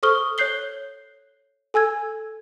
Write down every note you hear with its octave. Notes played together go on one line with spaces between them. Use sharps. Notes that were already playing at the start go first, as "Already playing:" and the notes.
A4 C5 C#6 D#6 F6 G7
C#5 F#6 G6 C7 G7
A4 G#5 E6 G#6